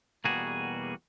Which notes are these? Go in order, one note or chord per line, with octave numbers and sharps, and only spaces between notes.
E2 B2 G3 A#3 F#4 G#4